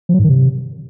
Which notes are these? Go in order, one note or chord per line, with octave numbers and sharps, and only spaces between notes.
F3
F#3
G#2
D#3
C3